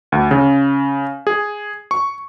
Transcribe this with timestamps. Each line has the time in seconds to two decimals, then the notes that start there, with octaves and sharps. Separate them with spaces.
0.12 D2
0.31 C#3
1.27 G#4
1.91 C#6